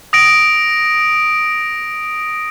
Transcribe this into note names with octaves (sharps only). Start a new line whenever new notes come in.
D#6 A#6 D7